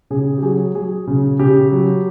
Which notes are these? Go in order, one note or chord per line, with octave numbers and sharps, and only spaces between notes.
C#3 G#4
G4
F#3 G#4
F#3 G#4
C#3
C#3 G4
F#3